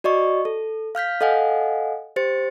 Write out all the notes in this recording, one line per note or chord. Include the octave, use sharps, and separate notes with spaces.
F#4 D5 D#5 C#6
A4
F5 F6 G6 B6
A4 D#5 F5 F#5 G#5
G4 C5 A6 C#7